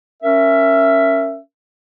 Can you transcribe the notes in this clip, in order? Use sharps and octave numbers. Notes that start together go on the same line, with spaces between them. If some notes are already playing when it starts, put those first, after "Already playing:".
C#4 A#4 E5